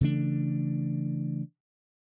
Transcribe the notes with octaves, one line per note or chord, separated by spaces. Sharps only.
C#3 E3 A3 D4